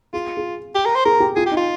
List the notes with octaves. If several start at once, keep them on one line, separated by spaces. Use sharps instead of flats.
F4 G#4
G#4
G4
A#4
C5
G#4 A#4
G4
F4 G#4
G4
D#4
F4